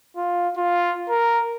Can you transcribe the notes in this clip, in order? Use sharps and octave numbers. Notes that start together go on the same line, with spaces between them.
F4
F4
A#4